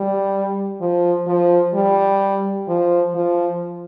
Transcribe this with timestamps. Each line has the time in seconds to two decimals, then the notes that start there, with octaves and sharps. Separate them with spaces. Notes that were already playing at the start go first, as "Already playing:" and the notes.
Already playing: G3
0.81 F3
1.27 F3
1.74 G3
2.68 F3
3.15 F3